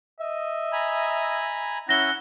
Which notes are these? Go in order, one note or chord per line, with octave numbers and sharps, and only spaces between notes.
D#5 E5
G#5 A#5 B5
C#4 E4 F#5 E6 A#6 G7